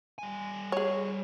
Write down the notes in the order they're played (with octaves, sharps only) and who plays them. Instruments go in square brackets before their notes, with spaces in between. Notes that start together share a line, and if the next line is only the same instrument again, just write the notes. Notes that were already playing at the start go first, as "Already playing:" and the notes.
[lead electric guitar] G3 G#5
[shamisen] G#4 C#5